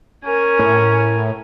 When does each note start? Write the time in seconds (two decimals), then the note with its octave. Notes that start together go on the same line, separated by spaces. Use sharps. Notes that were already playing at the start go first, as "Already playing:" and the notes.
0.25 C#4 A#4 G#5
0.59 A2